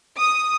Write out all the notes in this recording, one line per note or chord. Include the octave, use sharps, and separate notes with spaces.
D#6